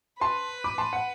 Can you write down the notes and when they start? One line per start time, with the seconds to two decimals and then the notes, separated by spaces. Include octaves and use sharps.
0.21 B4 A5 C6
0.64 B5 D6
0.78 A5 C6
0.93 F#5